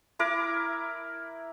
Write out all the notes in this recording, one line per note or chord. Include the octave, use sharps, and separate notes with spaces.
E4 A#4 D6